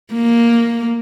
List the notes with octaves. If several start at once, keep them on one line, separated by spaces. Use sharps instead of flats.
A#3